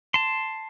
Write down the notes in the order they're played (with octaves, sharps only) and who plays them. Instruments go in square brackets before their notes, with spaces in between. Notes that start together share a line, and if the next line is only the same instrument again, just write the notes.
[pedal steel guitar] A5 C6